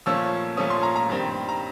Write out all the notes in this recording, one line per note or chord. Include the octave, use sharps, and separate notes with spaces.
A#2 F3 A3 C#4 E6
A#2 F3 A3 C#4 D#6
C6
A#5
A#5
G2 D#3 G3 C4
A#5